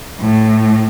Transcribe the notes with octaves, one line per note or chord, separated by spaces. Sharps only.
A2